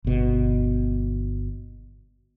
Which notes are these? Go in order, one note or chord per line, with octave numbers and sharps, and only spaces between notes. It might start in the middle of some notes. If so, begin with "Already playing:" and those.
G1 B2